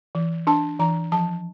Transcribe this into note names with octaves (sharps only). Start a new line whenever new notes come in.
E3
D4 A5
E3 A#5
F3 A5